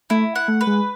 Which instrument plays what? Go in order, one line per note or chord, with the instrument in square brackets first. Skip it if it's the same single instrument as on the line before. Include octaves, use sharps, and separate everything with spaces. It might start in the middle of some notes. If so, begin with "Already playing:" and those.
[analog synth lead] A3 [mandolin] E4
[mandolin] F#5
[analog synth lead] A3
[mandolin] B4
[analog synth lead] G#3